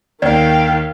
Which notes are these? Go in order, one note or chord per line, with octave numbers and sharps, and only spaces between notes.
D#2 D#3 D5 F5 G5